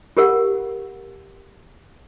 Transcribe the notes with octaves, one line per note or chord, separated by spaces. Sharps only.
F4 G4 A#4 F5 F#5